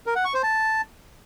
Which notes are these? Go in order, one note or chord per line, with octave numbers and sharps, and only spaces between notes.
A#4
F#5
C#6
C5
A5